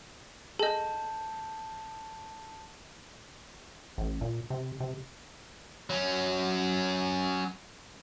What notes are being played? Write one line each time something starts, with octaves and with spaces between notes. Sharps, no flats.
G#4 A4 D#5 A5 G6
A1
A#2
C3
C3
F#3 C#4